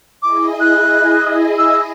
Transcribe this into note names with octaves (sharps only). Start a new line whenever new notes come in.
E4 G#4 D#5 D6
F#6
E6